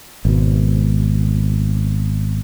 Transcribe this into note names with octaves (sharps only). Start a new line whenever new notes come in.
G#1 B2